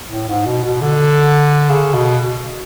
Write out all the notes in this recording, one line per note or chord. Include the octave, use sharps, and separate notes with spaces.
A2
G#2
B2
B2
D3
C#3
B2